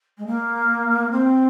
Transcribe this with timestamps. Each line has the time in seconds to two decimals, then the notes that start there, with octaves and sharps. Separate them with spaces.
0.18 G#3
0.26 A#3
1.12 C4